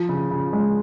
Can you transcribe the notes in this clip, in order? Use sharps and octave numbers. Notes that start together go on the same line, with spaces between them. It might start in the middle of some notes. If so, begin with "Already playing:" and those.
Already playing: F3
C#3
C#3
G#3